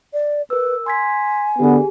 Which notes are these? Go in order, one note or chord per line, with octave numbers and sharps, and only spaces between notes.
D5
A#4 B4 E6
G#5 C6 G#6 B6
D3 B3 G4 G#4